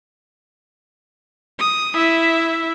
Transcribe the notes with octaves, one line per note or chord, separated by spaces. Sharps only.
D#6
E4 E5